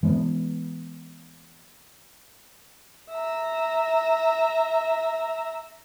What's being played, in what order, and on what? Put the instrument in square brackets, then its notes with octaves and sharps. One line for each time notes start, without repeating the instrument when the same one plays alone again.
[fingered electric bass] E3 G#3 A#3 B3
[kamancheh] E5 A#5